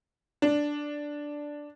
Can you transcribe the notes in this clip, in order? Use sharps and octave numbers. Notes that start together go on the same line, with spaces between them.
D4